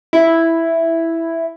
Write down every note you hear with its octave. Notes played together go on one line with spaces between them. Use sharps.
E4